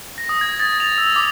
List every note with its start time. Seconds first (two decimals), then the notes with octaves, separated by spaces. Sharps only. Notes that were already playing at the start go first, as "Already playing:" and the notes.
0.18 A#6
0.29 D#6
0.41 G#6
0.60 A6
0.80 F7
0.98 E6
1.16 D6